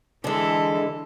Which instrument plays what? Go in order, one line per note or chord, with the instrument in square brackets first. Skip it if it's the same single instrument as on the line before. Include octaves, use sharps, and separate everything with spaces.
[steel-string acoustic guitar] D3 G#3 [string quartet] E3 A4